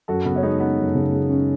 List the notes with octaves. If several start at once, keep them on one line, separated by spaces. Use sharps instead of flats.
F#2 F#4 A4
C#3 B3
C#4
G#3 B3 D#4
B3 C#4 D#4
F#2
C#3
G#3
C#4